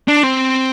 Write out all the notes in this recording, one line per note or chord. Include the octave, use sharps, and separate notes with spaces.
D4
C4